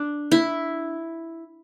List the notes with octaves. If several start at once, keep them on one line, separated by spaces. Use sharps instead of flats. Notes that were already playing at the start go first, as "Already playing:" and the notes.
Already playing: D4
E4